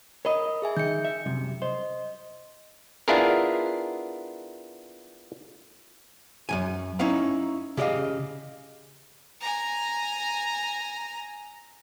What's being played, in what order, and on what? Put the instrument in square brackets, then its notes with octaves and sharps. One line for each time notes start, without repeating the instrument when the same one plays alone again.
[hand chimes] A#4 B5 D#6 [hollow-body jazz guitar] C#5 D#5
[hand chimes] G#4 E5 G#5
[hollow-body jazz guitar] D#3 [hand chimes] G6 C#7
[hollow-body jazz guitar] E5
C2 F#2 C3
[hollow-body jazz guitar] C5 [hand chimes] D#5
[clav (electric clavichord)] B3 D4 E4 F4 G#4 A#4
[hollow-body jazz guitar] F#2 D#3 G#5
C#4 D#4 E4 F5 A#5
C#3 G4 D5 D#5 F5
[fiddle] G#5 A#5